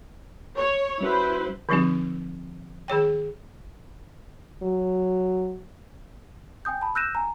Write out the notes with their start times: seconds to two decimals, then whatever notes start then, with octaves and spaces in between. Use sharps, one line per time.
0.56 C#5
1.01 G3 C#4 E4 F#4 B4 C5
1.69 D3 F3 G3 C4 D#4 G4
2.88 D#3 G#4 C#5 G5
4.62 F#3
6.65 G5 G#5 D#6 G6
6.81 A5 B5
6.95 E6 F#6 G6 A#6 D#7 E7
7.15 G#5 A#5